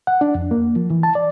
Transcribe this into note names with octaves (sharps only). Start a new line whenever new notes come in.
F#5
D4
F2
A#3
F3
E3
A5
D5